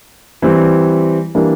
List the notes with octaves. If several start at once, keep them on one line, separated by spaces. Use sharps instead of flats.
E3 G3 C4
E3 G3 A#3 D4